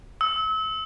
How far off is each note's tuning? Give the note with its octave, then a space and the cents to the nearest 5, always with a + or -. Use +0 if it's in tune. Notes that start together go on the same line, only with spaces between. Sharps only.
E6 -35